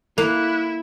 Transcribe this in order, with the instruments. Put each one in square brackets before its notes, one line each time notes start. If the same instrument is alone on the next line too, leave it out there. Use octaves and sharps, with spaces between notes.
[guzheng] A#3 [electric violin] E4 [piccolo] F#6